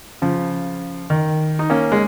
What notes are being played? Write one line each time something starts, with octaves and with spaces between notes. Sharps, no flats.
C#3 F3
D#3
D#4
A#3 C#4
G#3